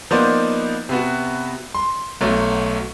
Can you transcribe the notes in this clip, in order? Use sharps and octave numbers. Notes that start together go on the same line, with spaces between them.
F3 A#3 B3 D#4 C5 D5
C3 B3 F#4
C6
B1 F#3 A3